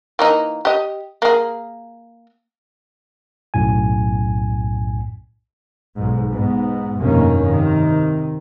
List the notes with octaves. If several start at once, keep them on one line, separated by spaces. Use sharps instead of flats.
E3 A#3 D#4
G4 D#5
A#3 G#4
B1 F#2 A2 G#5
B1 G#2
G#2 B3
F1 G2 B2 D#3 A#3 C#4
C3 D#3